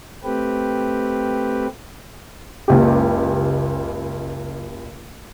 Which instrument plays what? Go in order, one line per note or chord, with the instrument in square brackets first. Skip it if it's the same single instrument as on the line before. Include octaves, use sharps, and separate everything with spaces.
[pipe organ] A3 C4 G4 B4
[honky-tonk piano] F#1 C#2 G4